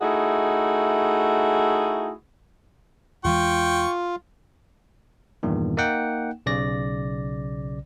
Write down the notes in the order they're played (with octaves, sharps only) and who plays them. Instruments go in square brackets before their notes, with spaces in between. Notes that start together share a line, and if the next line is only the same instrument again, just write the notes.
[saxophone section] A3 D#4 E4 F#4 G#4
[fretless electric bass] E2 E3 G#3 [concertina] F4 [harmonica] G5 C#6
[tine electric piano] E2 G2 A#2 D#3
A#3 D#4 F#5 G5
B1 C#3 D5 A#6